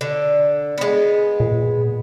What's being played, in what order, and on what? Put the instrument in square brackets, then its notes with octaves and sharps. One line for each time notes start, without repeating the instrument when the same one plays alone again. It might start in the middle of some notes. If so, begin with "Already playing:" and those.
[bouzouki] D3
G#3 B3
[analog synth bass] A#2